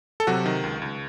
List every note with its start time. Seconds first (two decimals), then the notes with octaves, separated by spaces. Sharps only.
0.20 A4
0.27 C3 F#3 F#4
0.46 D#3
0.63 C#2
0.82 C#2